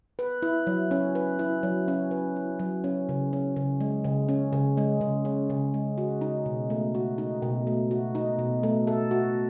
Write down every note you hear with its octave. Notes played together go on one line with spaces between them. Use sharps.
B4
E4
F#3
C#4
B4
E4
F#3
C#4
B4
E4
F#3
C#4
C#3
C#4
C#3
G#3
C#3
C#4
C#3
G#3
C#3
C#4
C#3
G#3
F#4
D#4
B2
A3
F#4
D#4
B2
A3
F#4
D#4
B2
A3
A4
F#4